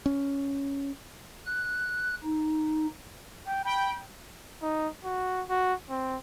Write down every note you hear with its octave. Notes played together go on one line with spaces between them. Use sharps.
C#4
F#6
D#4
G5
G5 B5
D#4
F#4
F#4
C4